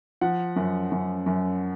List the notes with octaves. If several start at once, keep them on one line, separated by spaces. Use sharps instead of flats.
F3 F#5
F#2
F#2
F#2